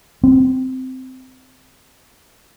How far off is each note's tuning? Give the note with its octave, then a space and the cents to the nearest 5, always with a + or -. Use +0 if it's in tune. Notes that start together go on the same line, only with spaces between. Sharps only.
C4 -15